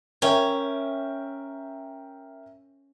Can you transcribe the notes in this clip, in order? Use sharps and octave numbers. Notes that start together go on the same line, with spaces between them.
C#4 A#4 E5 G5